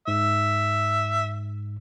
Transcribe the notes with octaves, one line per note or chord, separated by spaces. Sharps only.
G#2 E5